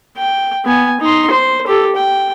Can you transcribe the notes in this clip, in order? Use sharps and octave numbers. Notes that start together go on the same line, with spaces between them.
G5
B3 G#5
D#4 C6
C5
G4 A4
G5